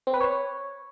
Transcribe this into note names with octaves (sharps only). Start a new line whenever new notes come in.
C4
B4
C#5